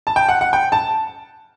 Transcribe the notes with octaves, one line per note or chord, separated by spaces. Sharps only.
A5
G5
F#5
F#5
G5
A5